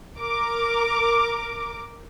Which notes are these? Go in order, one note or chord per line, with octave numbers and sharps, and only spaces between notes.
A#4 D6